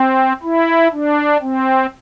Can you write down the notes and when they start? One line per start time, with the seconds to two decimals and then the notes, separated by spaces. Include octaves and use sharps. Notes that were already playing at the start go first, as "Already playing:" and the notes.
Already playing: C4
0.43 E4
0.92 D4
1.42 C4